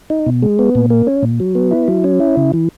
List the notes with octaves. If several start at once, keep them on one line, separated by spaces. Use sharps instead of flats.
D#4
B2
G#3
B3
A#2
A#3
C#4
A#2
F#3
B3
E4
F#3
C#4
E4
C#3
E3